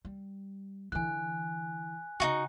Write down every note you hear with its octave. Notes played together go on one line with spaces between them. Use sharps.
G3
D3 E3 G#5 F#6
C#3 D#4 F4 F#4